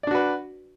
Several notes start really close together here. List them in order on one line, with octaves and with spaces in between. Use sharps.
D5 D4 F#4 B4